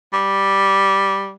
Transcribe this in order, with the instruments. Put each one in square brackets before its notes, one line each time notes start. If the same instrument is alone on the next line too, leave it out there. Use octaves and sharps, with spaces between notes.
[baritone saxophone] G3